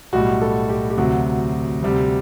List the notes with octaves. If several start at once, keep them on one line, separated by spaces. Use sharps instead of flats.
B1 A2 G3 F#4
A4
G4
G4
D2 C3 F#3 F#4
D2 C3 G3